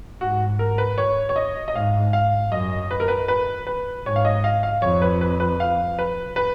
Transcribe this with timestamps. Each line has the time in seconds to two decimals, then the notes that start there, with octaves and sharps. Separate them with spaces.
0.21 G#2 F#4
0.59 A#4
0.78 B4
0.98 C#5
1.29 C#5
1.36 D#5
1.68 D#5
1.74 G#2 F5
2.13 F5
2.52 F#2 D#5
2.91 B4
3.00 A#4
3.08 B4
3.28 B4
3.67 B4
4.06 G#2 C#5
4.16 F5
4.25 D#5
4.44 F5
4.63 F5
4.82 F2 C#5
5.02 B4
5.21 B4
5.40 B4
5.60 F5
5.99 B4
6.36 B4